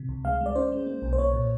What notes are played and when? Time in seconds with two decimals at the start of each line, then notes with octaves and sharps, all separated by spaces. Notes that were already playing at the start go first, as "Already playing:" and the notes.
Already playing: C3
0.09 C#2
0.25 G#3 F5
0.41 G#3 D5
0.55 C#4 C5
0.72 G#3
0.87 A#3
1.02 B1
1.13 C5
1.18 A#3 C#5
1.33 A#2